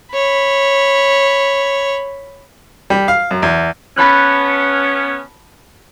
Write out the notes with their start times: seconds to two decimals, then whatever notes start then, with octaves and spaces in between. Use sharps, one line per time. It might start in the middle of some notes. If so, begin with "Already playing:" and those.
0.13 C#5 B5
2.90 G3
3.08 F5
3.31 F#2
3.43 E2
3.97 B3 C#4 A5 B5 F#6